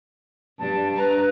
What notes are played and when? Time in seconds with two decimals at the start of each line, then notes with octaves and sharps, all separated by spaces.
0.59 G2 G3 D4 A5
0.97 G2 B4 A#5